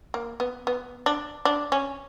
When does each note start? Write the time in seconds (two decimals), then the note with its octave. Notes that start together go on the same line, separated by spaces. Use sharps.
0.14 A#3
0.40 B3
0.67 B3
1.06 D4
1.45 D4
1.72 C#4